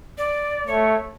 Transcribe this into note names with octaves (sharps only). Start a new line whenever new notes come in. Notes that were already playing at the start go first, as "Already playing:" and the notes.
D5
A3 C#5